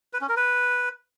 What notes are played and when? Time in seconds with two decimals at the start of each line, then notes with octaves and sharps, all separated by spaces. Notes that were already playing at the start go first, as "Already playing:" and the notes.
0.13 B4
0.21 C#4
0.29 A#4
0.37 B4